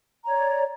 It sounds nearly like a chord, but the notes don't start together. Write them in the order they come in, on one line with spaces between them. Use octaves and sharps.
A#5 C#5 D5